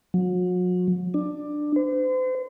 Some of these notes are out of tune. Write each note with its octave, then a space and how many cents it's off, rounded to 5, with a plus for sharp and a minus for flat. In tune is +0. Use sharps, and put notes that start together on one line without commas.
F#3 -40
D4 +15
C5 -40